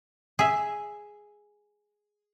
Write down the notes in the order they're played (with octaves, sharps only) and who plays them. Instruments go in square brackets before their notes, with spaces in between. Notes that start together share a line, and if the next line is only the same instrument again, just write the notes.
[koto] G#4 E5